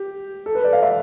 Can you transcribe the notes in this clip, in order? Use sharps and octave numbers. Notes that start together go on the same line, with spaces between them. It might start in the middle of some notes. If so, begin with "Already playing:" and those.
Already playing: G4
A4
B4
D5
F5
E5